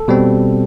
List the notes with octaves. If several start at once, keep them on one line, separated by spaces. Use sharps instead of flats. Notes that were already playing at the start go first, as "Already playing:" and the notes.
Already playing: A4
B2 G3 C4